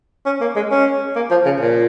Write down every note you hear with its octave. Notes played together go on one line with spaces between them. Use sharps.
C#4
A#3
G#3
C#4
A#3
F3
C#3
A#2